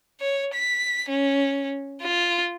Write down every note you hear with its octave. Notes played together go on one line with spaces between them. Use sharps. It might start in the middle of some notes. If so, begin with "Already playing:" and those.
C#5
B6
C#4
F4